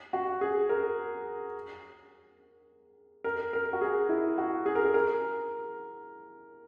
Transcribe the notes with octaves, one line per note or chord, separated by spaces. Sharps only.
F#4
G#4
A#4
A#4
A#4
F#4
G#4
E4
F#4
G#4
A#4
G#4
A#4